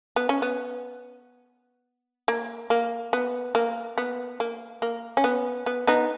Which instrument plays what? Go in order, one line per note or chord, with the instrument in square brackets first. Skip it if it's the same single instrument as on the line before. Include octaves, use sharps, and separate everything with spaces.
[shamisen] B3
C#4
B3
A#3
A#3
B3
A#3
B3
A#3
A#3
C#4
B3
B3
B3 D#4